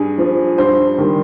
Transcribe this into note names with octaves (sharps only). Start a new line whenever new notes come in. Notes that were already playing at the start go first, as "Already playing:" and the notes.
Already playing: G2 G#4
F3
G2 C5
D#3 G3